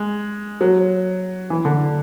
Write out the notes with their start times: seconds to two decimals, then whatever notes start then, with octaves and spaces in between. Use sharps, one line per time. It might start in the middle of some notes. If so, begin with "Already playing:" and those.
Already playing: G#3
0.61 F#3
1.50 E3
1.65 D3